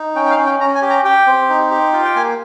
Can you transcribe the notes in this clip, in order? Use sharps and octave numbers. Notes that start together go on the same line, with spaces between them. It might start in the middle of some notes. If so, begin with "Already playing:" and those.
Already playing: D#4
C#4 G5
G5
F5
C#4
G5
C#4 A#5
G#5
G4
A#5
G4 G5
C4
D#4
G4
F4
G5
A#3 G#5